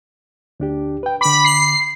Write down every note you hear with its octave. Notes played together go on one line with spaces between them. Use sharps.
D2 D4 G4
B4 G5
D3 B5 D6
C7